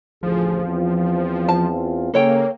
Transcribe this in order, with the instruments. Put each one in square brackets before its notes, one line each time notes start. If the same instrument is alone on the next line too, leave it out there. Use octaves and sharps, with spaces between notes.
[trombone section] A1 D2 G#4 [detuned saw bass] F3
[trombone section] E2 C4 F4
[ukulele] A5
[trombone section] C#3 G#4 [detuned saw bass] A#3 [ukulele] A4 C#5 G5